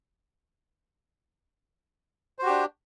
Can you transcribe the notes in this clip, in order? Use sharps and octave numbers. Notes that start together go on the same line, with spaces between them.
D4 F#4 G4 C5